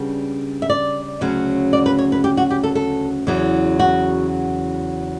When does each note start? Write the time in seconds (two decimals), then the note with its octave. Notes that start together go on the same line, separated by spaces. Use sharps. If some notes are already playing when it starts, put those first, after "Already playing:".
Already playing: C#3 G3 B3 D4
0.62 E5
0.70 D5
1.21 D2 C#3 F#3 C#4
1.73 D5
1.86 B4
1.99 C#5
2.12 B4
2.24 G4
2.37 F#4
2.50 G4
2.64 A4
2.75 A4
3.27 E2 C#3 F#3
3.80 F#4